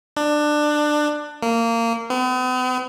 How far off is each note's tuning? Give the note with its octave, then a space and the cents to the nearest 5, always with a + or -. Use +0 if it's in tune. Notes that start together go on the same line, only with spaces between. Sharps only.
D4 +20
A#3 -20
B3 +45